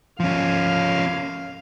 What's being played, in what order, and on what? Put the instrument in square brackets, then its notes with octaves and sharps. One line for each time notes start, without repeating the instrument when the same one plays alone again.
[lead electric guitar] F3 C#4 [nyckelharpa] F5